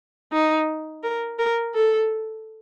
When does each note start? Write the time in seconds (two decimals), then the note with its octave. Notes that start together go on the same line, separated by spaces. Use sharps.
0.33 D#4
1.04 A#4
1.39 A#4
1.75 A4